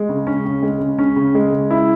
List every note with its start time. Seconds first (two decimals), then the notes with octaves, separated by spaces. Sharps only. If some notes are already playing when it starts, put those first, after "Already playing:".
Already playing: G#3
0.09 C#3
0.27 C#4
0.45 C#3
0.63 G#3
0.80 C#3
0.99 C#4
1.16 C#3
1.35 G#3
1.52 C#3
1.71 E4